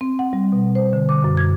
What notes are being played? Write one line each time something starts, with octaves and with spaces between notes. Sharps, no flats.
C4
F#5
G3
B2
C5
D3
D6
F#2
G#6